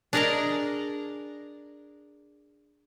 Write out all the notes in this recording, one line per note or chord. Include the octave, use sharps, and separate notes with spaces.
D4 G#4 A#4 D5 D#5 A#5